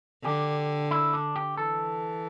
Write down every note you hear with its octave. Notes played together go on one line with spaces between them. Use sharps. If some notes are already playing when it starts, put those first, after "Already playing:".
D3 G4
E4
D4
G4
E3 A4